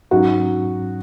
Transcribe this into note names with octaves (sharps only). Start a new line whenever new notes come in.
G#2 F#3 C#4 D#4 F#4